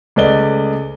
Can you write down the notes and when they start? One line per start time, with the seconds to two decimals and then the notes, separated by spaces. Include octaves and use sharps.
0.16 C#2 A3 B4 D5 D#5 G7